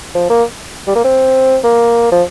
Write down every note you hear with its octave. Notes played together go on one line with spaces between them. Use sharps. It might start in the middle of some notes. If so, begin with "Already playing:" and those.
F3
A#3
G3
A#3
C4
A#3
F3